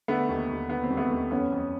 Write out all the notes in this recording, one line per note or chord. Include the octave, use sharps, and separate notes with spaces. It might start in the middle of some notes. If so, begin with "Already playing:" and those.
D3 A3 B3
D#2
D#2
D3 B3
C4
D#2
A3 B3
D#2
F2 B3 C#4
F2